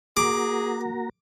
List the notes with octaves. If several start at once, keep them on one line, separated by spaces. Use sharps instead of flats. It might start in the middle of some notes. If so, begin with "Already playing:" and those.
A#3 F#4 G#4 A#5 D6